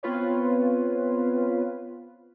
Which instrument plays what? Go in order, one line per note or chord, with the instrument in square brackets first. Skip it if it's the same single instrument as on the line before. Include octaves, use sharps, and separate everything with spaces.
[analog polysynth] B3 C4 F4 B4 C#5